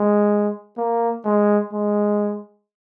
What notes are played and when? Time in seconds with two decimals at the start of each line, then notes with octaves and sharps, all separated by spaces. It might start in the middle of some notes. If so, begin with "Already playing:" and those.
Already playing: G#3
0.77 A#3
1.25 G#3
1.72 G#3